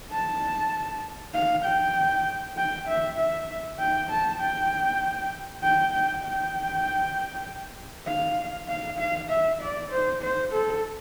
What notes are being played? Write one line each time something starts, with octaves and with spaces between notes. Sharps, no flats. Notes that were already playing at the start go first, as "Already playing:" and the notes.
A5
F5
G5
G5
E5
E5
G5
A5
G5
G5
G5
G5
F5
F5
F5
E5
D5
C5
C5
A4